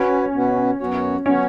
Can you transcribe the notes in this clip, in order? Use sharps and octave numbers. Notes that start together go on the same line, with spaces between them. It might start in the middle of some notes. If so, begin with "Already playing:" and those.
Already playing: C#4 F#4 B4
B2 B3 F#4 B4
F#2 F#3 B3 F#4 C#5
F#3 B3 C#4 F#4 C#5